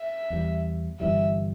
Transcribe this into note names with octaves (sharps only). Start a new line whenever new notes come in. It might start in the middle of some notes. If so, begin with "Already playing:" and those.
Already playing: E5
E2 E3 G3
G1 G2 E3 G3 E5